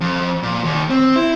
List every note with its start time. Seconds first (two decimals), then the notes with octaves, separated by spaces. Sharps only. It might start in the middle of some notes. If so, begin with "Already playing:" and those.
0.01 F2
0.43 A#2
0.64 D#2
0.90 C4
1.16 E4